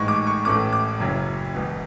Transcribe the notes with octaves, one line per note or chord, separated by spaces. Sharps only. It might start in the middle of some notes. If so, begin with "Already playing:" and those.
Already playing: A1 G#2 G#3 C#6
D6
C#6
A1 A2 E3 A3 C#4 D6
D6
F#1 F#2 C#3 F#3 C#4
E1 E2 B2